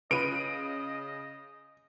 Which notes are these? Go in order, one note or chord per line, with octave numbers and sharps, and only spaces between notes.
C#3 F4 B4 D#5 D7 D#7